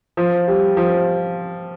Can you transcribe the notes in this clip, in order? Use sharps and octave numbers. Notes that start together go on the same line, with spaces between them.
F3
G3
F3